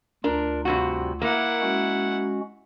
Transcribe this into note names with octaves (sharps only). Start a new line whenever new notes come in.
D2 D4 F4 A#4
G2 C3 F#4
A#3 E4 A#4 F#5
G#3 C#4 F#4